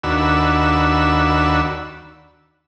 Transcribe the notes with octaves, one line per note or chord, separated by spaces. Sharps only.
D#2 D4 F#4 B5 E6